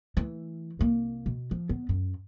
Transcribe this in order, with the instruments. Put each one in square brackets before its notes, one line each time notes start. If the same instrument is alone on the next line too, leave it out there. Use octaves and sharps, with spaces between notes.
[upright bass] E3 A3
C2 A#3
B2
F3
B3
F#2